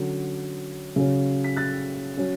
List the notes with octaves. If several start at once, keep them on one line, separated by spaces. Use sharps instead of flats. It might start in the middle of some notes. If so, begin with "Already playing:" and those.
Already playing: D3 F#3 C#4
C#3 F#3 C#4
B6
F#6 A6
F#3 C#4